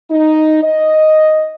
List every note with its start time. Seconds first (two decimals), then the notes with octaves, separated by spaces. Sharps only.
0.10 D#4
0.63 D#5